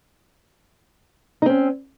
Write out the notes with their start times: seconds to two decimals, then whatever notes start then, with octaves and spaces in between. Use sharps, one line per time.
1.42 D#4
1.46 C4
1.50 C#4